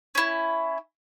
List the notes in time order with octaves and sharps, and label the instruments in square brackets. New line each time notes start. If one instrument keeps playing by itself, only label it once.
[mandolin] C#4 E4